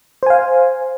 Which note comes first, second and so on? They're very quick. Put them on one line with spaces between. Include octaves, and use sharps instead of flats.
C5 G#5 F5